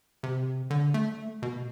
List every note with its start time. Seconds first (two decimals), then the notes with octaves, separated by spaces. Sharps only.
0.23 C3
0.70 D3
0.94 A3
1.42 B2